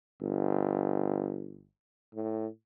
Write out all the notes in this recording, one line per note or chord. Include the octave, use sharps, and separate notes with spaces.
G1
A2